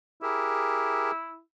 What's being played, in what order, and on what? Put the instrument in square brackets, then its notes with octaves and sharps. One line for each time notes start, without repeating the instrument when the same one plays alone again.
[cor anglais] E4 [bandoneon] G4 G#4 A#4